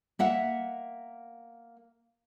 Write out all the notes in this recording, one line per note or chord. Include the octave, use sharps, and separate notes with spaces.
A#3 E5 F#5